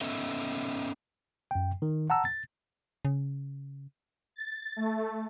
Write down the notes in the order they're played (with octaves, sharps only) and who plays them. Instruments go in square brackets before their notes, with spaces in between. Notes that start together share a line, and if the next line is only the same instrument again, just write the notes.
[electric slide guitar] B3 C#4 A4 D#5 E5
[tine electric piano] F#2 G5
D#3
F#5 A5 A#5 E6
A6
[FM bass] C#3
[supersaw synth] A6
A3